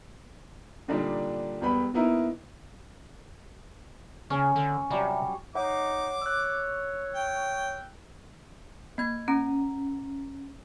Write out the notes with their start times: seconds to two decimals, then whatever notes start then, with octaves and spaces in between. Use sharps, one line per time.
0.88 A#2 D3 G3 D4 D#4
1.61 E1 G3 B3 B5
1.94 A#3 B3 D#4 E4 A#4
4.30 C#3 C#4
4.56 D3
4.90 C3 F#3 G3
5.55 D#4 C#5 F#5 D6
6.22 C#5 E6 F#6
7.14 G5
8.98 A#3 G#6
9.28 C#4 A#5